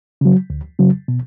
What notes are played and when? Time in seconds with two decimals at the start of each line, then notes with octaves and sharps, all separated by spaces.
0.21 C#3 F#3
0.50 D2
0.79 C#3 F#3
1.08 B2